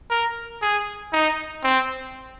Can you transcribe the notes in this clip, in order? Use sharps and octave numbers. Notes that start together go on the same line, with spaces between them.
A#4
G#4
D#4
C4